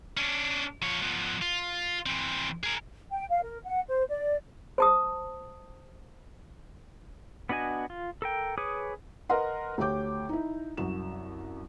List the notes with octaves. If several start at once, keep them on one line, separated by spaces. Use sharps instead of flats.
C#4 D4
F3 C#5
F3 B3
F4
E3 C4
G#4 A#4
G5
F5
A#4
F#5
C5
D5
C5 A5 D#6
B3 D4 F#4 D#5 G#5
F4
A4 A#4 G5
G#4 B4 C#5 D6 D#6
A#4 B4 D#5 F#5 C6
D2 G4 C#5 G5 D6 G6
D#4 E4
C2 F#2 F#4 E7